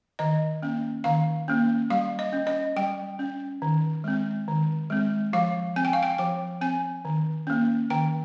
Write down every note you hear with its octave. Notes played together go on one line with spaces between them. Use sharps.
D#3 D#5
A#3 C#4
D#3 F5
A#3 C#4
G3 F5
D#5
C#4
D#5
G3 G5
C#4
D#3
G#3 C4
D#3
G#3 C4
F3 F5
C4 G#5
G5
F5
G5
F3 G5
C4 G#5
D#3
A#3 C#4
D#3 G5